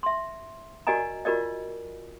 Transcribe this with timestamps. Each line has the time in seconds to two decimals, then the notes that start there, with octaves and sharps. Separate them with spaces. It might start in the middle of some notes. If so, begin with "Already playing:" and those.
0.03 E5 C6
0.87 F#4 A#4 D5 D#5 G#5 A#5
1.25 F4 F#4 A#4 D5 D#5